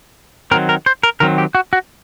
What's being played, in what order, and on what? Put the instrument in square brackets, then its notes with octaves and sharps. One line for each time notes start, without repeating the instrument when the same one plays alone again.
[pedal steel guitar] D#3 F#3 C4 A#4
A#4
C5
A#4
D#3 F#3 C4 A#4
G4
F#4
F#4